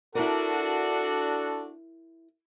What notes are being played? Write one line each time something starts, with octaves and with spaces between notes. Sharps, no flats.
D4 E4 F#4 A4 A#4